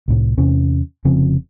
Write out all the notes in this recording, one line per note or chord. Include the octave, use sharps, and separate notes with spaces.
C2 A2
E2 C3 C#4
F1 C#3 F3 C4